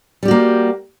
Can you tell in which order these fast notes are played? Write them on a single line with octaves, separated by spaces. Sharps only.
G3 G4 F#4 A#3